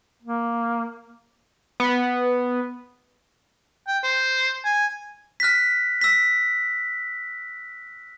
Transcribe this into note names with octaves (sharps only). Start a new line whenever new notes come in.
A#3
B3
G5
C5
G#5
F6 F#6 A#6 B6
E6 A#6 B6